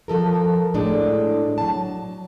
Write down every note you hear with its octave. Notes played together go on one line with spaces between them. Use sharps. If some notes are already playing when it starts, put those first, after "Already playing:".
F3 A4 A#4
A2 G#3 D4
F#3 A5